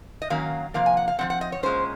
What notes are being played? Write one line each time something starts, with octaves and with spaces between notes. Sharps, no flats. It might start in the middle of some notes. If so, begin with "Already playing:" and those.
D#5
D#3 F#3 A#3 C#4 F5
C3 F3 A#3 F5
G#5
F#5
F5
F3 G#3 C4 F#5
F#5
D#5
C#5
A#2 G#3 C#4 C5